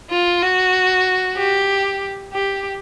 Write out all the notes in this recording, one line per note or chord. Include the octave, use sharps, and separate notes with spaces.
F4
F#4
G4
G4